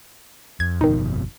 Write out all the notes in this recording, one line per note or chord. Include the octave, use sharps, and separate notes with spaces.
F2 G#6
G1 F2 B2 D#3 D#4